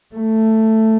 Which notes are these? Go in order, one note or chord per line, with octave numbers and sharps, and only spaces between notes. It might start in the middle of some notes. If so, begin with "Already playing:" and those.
A3